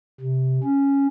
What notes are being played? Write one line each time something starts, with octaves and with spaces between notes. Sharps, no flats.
C3
C#4